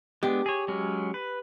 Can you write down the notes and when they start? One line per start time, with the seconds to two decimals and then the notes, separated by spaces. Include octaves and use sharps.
0.23 G#3 B3 D4 G4
0.46 G#4 C#5
0.68 F#3 G#3 C#4
1.14 B4